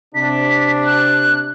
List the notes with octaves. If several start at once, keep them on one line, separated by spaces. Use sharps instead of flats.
C3 D4 B6
F#6